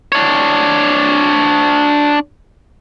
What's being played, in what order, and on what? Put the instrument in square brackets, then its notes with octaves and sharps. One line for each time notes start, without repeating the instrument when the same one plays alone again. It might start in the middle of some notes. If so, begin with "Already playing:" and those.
[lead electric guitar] D4 C#5